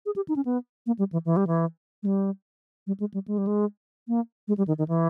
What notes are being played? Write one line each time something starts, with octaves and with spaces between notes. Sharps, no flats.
G#4
G4
D#4
C#4
B3
A#3
G3
E3
E3
G3
E3
G#3
G3
G3
G#3
G3
G#3
G3
G#3
A#3
G#3
G3
D#3
D#3
E3